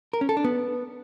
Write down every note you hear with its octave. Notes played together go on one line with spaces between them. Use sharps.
A#4
C#4
A4
D4
B3